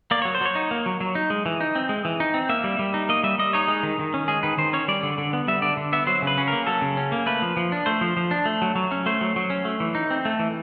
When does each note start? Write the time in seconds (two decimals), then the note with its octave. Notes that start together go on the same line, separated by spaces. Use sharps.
0.11 A#3 D5
0.22 F#3 C#5
0.35 C5
0.41 F#3 C#5
0.55 D#4
0.71 A#3
0.86 F#3
1.01 F#3
1.15 D#4
1.30 G#3
1.46 E3
1.61 D#4
1.75 C4
1.89 G#3
2.05 E3
2.20 D#4
2.34 C4
2.49 A#3 E5
2.64 G3
2.79 G3
2.94 D#4
3.09 A#3 D#5
3.24 G3 E5
3.38 G3 D#5
3.53 D#4 C#5
3.68 G#3
3.83 D#3
3.99 D#3
4.14 C#4
4.28 G#3 G#4
4.43 D#3 B4
4.58 D#3 C5
4.73 C#4 C#5
4.88 G3 D5
5.03 D3
5.18 D3
5.33 B3
5.48 G3 E5
5.62 D3 D5
5.77 D3
5.93 B3 E5
6.07 F#3 C5
6.22 C#3
6.27 B4
6.38 C#4
6.48 A#3 A#4
6.67 F#3 A4
6.81 C#3
6.97 C#4
7.12 A#3
7.26 A3 B4
7.42 F3
7.57 F3
7.72 D4
7.86 A3 C5
8.01 F3
8.17 F3
8.31 D4
8.46 A3
8.62 F#3
8.75 F#3
8.91 C#4
9.06 A3 C5
9.21 F#3
9.36 F#3
9.50 C#4
9.65 A3
9.80 E3
9.95 D#4
10.11 C4
10.25 A3
10.40 E3